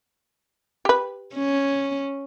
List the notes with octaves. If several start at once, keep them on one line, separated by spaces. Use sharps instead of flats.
G4 B4
C#4